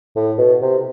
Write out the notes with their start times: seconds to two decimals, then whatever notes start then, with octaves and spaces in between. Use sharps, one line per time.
0.16 A2
0.38 B2
0.61 C3